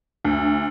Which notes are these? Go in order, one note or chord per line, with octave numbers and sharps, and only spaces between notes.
D2